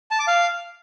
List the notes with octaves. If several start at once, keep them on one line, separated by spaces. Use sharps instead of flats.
A5
D6
F5